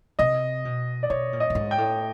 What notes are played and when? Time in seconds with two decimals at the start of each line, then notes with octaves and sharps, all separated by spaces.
0.19 C3 D#5
0.65 B2
1.03 D5
1.10 B2 C#5
1.33 A#2
1.40 D#5
1.50 A2
1.55 G#2
1.71 G5
1.78 A2